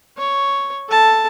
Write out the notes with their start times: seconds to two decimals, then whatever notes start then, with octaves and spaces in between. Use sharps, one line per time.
0.17 C#5
0.89 A4 A5